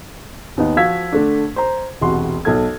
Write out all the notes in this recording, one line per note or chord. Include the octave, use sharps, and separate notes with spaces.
D#2 B3 D#4
F3 F#4 F5 E6 G#6 B6
D3 A3 D4
C5 A#5
E1 C2 F#4 C6
B1 A4 G#6